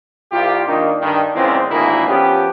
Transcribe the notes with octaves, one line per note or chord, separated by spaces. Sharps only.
C2 F4 G4
D#3 A#3 D4 D#4
G2 D3 D#3
E2 A#2 C#3 G#3 C4
G#1 E2 D3 A#3 E4 G#4
F3 B3 C#4 G4